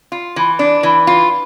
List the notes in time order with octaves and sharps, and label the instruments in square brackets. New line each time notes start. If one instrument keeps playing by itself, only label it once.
[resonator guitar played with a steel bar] F4
E3
D4
E3
F4